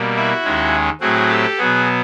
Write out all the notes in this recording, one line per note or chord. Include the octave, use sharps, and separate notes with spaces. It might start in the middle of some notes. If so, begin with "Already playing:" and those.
Already playing: B2 G3 A#3
E4 F#4
D#2 D#3 G#3 C#4
A2 F#3 A3 C4 F#4 G#4
G4 A4
B2 F#3 B3 F#4 G#4